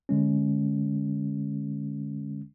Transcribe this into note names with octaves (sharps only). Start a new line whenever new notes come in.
D3 G#3 C#4